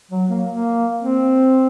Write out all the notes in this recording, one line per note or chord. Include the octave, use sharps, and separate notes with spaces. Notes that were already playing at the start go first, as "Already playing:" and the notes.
F#3
A#3
A#3
C4